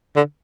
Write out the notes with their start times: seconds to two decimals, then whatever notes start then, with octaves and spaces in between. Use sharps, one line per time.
0.16 D3